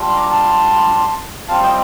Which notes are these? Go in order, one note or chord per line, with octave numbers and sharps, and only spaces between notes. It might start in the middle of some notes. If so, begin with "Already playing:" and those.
Already playing: G3 D4 F4
C6
A#5 D6
A5 C6
G3 C4 F4 F5 A5
D#5 G5